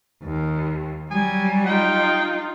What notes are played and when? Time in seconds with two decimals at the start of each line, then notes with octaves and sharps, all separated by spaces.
0.23 D#2
1.11 F#3 G3 G#5
1.66 D#4 F4 G5